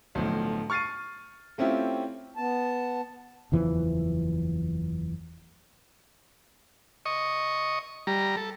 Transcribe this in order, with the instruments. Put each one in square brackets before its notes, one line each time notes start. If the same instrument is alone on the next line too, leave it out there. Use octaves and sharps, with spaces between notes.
[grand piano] B1 A2 D3 F3
C#6 F6 A6 C7 D#7
A3 C4 C#4 E4 F4 G4
[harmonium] B3 A5
[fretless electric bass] F#1 E2 E3 F3
[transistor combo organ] D#5 C#6
G3 A#5
A4